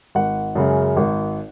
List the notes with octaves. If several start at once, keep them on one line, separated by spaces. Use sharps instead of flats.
G#1 F#5
F#2 C#3 G#3
G#1